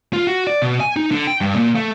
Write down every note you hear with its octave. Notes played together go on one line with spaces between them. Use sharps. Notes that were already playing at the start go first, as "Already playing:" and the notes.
F4
F#4
D5
B2
G#5
D#4
D3
G5
G2
A#2
A3